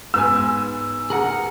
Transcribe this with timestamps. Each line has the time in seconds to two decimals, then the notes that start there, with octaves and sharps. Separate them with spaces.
0.14 G#2 B3 G#5 E6
1.10 G#4 A#4 F#5